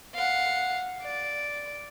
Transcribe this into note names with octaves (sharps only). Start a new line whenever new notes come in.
F5 F#5
D5